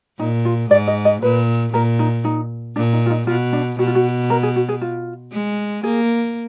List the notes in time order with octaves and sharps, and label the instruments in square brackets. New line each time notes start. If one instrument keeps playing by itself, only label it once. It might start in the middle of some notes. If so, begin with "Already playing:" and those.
[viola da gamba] A#2 [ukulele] D#4
[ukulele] F4
[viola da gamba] G#2 [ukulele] D5
[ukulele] D#5
D#5
[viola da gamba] A#2 [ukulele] B4
[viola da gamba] A#2 [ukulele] A#4
[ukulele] D#4
D#4
[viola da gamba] A#2 [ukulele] D4
[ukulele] D#4
F4
D#4
[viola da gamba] B2 [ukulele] F4
[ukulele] D4
[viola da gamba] B2 [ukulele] F#4
[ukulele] F4
F#4
A#4
G#4
F#4
G#4
F4
[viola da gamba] G#3
[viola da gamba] A#3 [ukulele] G#4